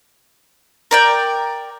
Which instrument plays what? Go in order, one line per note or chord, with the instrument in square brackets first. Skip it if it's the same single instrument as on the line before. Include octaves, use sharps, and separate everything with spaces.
[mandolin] A#4 D5 G5